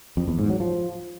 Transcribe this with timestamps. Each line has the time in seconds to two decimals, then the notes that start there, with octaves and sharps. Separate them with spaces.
0.17 F2
0.28 E2
0.39 G#2
0.49 F#3
0.60 F3